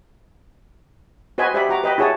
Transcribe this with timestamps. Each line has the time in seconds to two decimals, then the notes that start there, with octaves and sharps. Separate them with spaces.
1.38 F#4 B4 C5 D#5 G#5 B5
1.54 G4 C5 D5 E5 G5 B5
1.69 F#4 A#5 D6
1.84 B4 D#5 G5 B5
1.98 E4 F#4 G#4 C#5 A5 D#6